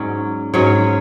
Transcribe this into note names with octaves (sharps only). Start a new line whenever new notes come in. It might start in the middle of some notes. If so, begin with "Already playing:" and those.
Already playing: G#2 F#3 C#4 D5
G#2 F#3 C#4 C#5